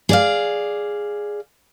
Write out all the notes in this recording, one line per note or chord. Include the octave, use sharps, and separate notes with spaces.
G#4 D5 F5